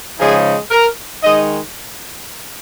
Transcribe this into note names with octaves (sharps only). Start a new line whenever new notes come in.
C#3 F3 G#3 D#4 G#4
A#4
D#3 G#3 D#4 D#5